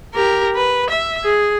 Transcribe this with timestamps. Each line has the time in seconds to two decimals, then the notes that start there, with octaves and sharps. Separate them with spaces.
0.14 G4 A#4
0.56 B4
0.90 E5
1.24 G#4